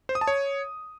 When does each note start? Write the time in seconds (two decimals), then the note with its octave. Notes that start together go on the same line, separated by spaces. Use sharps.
0.09 C5
0.15 D#6
0.21 A5
0.27 C#5